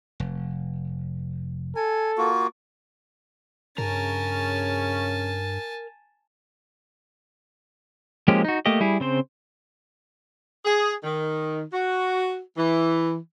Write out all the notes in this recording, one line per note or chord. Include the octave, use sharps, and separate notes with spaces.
F1
A4 G#5
A#3 F4 F#4
G2 C#3 C#4 A#4 G#5 A5
F3 G#3 A#3 C#4 G4
D#4 F#4
A3 A#3 G4 D#5
G3 E4 G#4
C#3 C4 C5
G#4
D#3
F#4
E3